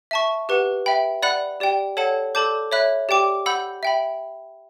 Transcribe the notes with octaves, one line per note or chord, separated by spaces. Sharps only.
E5 A5 C#6
G4 B4 F#5
E5 G5 B5
D5 F#5 B5 F#6
G4 D5 G5
A4 C#5 F#5 A5
A4 D5 A5 D6 G6
C#5 E5 B5 F#6
G4 D5 G5 D6
F#5 B5 E6 G6
E5 G5 B5